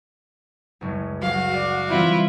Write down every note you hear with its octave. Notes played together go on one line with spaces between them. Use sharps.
F#1 C#2
F#3 F#4 F5
D5
E3 G3 C4 E4 F4